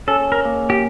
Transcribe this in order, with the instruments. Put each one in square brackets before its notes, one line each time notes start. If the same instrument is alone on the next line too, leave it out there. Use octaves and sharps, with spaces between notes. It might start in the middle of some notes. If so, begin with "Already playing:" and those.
[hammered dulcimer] C#4 [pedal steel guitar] A4
[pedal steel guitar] A#4
[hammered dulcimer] A#3
[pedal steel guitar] G4